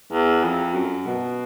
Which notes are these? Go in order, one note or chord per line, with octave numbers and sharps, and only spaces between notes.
E2
F2
F#2
B2